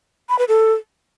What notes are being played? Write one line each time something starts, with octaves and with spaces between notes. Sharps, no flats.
B5
B4
A4